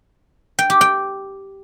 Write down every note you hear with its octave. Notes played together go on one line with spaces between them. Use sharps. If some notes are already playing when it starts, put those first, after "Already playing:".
G5
G4
G5